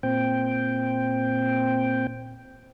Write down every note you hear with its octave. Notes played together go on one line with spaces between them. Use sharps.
A#2 C4 G5